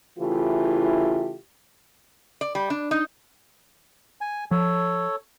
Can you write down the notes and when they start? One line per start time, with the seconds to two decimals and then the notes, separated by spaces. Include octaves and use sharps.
0.19 C#3 E3 A3 E4 F4 G4
2.41 D5
2.55 G3
2.70 D4
2.91 D#4
4.21 G#5
4.51 F3 A4 C#5